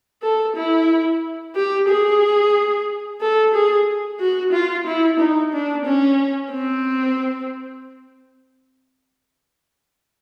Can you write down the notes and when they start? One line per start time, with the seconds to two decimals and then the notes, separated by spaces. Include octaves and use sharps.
0.23 A4
0.56 E4
1.55 G4
1.88 G#4
3.21 A4
3.53 G#4
4.20 F#4
4.53 F4
4.87 E4
5.19 D#4
5.52 D4
5.85 C#4
6.52 C4